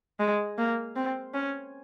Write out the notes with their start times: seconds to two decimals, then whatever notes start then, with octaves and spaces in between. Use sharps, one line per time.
0.19 G#3
0.58 A#3
0.96 C4
1.34 C#4